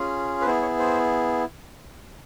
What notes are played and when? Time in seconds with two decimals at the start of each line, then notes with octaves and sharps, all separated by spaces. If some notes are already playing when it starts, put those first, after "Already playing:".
Already playing: C#4 F4 G#4
0.41 B4
0.46 B3 E4 G#4 C5
0.62 C#5
0.79 C5